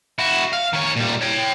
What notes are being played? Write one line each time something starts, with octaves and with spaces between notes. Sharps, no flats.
E4 F#4
F5
D#3 C#5
A#2 G3
C#5 G5